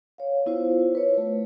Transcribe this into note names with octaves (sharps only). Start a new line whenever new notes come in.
C#5 F5
B3 E4 F4 C5 F5
B4 C#5
A3